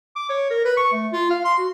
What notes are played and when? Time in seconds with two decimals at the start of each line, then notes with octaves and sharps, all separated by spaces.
0.16 D6
0.29 C#5
0.51 A#4
0.65 B4
0.77 C#6
0.93 A3
1.13 F4
1.30 F5
1.45 C6
1.58 F#4